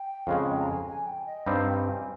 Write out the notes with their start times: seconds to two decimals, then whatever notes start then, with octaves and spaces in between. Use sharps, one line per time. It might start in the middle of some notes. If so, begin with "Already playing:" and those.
Already playing: G5
0.27 F2 C#3 G#3 F5
0.47 G5
0.60 A#5
0.67 G#5
0.86 G#5
1.06 G5
1.26 D#5
1.46 G2 G3 C4 D#4 F5
1.66 G5
1.86 G#5